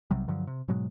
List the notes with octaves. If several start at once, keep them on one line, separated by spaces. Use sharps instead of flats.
B1 C3 F#3 G3
G2 D3 F3 F#3
C3
G#2 B2 F#3 G#3